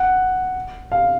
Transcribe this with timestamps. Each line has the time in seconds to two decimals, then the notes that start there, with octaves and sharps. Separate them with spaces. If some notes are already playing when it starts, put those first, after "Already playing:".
Already playing: F#5
0.92 F5